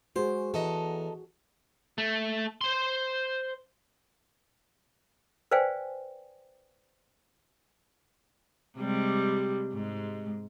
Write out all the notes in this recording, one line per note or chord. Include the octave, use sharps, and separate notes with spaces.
G#3 F#4 G#4 C5
E2 A4 D#5 A#5
A3
C5 C6
B4 C5 D5 F5 G5 G#5
C3 G3 G#3
G#2 G#3